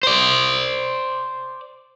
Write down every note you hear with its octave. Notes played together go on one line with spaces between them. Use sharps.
C5 D5